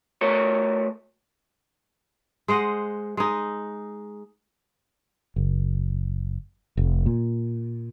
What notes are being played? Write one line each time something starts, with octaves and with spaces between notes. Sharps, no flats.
A3 F#4 A#4 B4 C#5
G#3 C5 D#5 F#5
G#3 D#4
F#1
F1
A#2